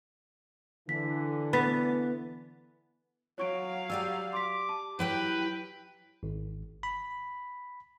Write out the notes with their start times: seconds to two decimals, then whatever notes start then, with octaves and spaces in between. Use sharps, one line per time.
0.89 D3 E3 B6
1.53 B3 B5 A6 B6
3.38 F#3 C#5 F5 C#6 D7
3.90 G3 G4 D5 G#5 E6
4.33 C6 D6 B6
4.69 A5
4.99 F#3 E4 G4 B4 G5 D7
6.23 G#1
6.83 B5